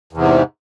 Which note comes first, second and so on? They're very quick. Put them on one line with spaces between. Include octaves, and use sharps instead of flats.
E2 C3 G#2